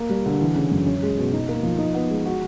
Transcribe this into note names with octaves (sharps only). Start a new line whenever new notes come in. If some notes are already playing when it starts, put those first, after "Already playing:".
Already playing: A#3
G3
D3
E3
C#3
F#2
C#4
G#3
B2
D#4
A#3
F3
D#4
B3
G#3
F#4